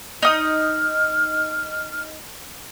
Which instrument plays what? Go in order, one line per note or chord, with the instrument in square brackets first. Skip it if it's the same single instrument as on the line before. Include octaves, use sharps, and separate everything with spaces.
[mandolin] D#4 D#6 [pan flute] F6